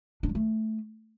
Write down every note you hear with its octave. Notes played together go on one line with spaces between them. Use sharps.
D4
G#3
A3